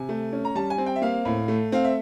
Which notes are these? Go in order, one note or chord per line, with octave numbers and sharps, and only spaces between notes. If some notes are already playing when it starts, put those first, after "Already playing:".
Already playing: C3 G#5
A3
C#4
A#5
G3 A5
G#5
C4
G5
E5
A#3 F5
A2
A3
C4 F5
E5